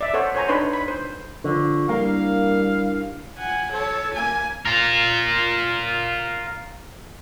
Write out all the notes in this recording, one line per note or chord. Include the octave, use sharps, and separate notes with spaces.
D5 E5
A4 C5 C#5 F#5
C5 C#5 G#5 A#5
D4 D#4 B4 C#5 C6
B5
C5
D3 F3 C#6
G3 A#3 D4 E4 A#4 F5
F#5 G#5
A4 C#5
A#3 G#5
F4 A#4